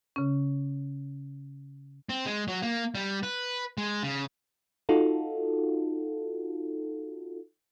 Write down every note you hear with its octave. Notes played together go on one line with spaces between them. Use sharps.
C#3 C#4
C4
G#3
F#3
A#3
G3
B4
G#3
C#3
D#4 F4 F#4 A4